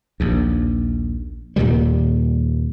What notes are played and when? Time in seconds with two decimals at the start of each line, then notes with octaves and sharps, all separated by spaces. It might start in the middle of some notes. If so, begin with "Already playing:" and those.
0.20 A#1 D#2
1.56 D#2 A#2 D#3 G3